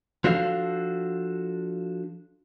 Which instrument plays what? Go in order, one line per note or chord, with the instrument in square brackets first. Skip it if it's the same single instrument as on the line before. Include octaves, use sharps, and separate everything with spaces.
[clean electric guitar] F3 D4 F#4 A4 F5